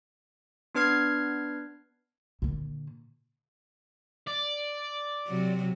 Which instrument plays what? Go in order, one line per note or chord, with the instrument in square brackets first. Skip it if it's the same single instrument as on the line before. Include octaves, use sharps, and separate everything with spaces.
[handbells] B3 D4 B4 F6 G#6 C7
[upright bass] A#2 D3
[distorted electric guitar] D5
[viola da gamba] C3 F#3